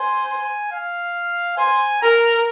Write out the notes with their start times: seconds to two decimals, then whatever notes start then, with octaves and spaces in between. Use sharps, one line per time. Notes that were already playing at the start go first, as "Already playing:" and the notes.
Already playing: C5 G#5
0.72 F5
1.58 C5 G#5
2.02 A#4 A#5